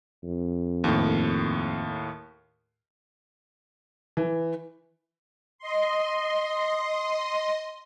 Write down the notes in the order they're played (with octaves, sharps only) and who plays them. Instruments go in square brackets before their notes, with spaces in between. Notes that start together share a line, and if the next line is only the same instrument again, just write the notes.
[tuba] F2
[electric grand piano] D#2 A2
[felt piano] E3
[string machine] D#5 C6